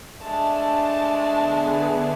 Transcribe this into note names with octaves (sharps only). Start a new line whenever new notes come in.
G#3 A3 D4 A5
D3 B3 G#4